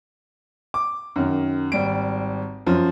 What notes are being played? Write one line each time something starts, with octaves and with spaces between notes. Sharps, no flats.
D6
F#2 D#3
G#1 G3 D7
F#2 F3